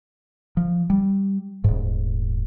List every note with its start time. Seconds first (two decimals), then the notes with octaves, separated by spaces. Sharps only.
0.57 F3
0.90 G3
1.64 D#1 G#2